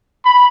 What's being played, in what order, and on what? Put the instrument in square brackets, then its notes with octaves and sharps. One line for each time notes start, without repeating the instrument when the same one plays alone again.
[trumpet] B5